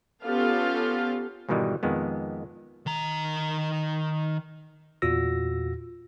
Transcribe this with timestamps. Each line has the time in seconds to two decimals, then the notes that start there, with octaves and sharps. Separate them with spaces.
0.23 B3 C#4 F4 G4 A4 F5
1.49 G#2 B2 D#3 E3 G3 G#3
1.83 F2 D#3 G#3 B3
2.86 D#3 A#5
5.02 E2 A#2 F4 F#4 E6 A#6